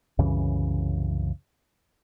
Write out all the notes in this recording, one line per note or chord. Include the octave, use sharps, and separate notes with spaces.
C2 F#2 C#3 E3